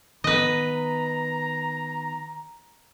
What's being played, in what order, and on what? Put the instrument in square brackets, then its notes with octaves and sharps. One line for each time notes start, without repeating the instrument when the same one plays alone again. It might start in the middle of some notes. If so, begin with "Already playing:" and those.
[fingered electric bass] D#3 B3 [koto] B4 D#5 [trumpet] A#5